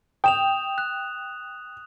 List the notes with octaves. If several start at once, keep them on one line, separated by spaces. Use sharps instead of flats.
G5 D#6 E7 F7
F#6